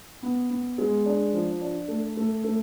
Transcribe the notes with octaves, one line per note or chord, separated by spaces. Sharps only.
B3
B3
G#3
D4
F3
D4
A3
A3
A3